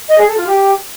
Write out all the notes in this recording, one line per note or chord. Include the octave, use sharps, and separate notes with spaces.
D#5
G#4
A4
F4
G4